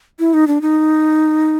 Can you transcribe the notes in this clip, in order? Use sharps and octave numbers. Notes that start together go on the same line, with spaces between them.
E4
D#4
D4
D#4